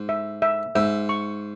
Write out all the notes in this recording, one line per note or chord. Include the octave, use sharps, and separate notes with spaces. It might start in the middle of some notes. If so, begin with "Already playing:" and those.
Already playing: G#2
E5
E5
G#2 E5
C#6